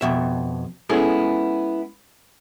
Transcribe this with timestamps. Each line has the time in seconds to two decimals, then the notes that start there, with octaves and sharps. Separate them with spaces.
0.01 F2 B2 E5
0.89 G#3 B3 C#4 E4 G#4 A4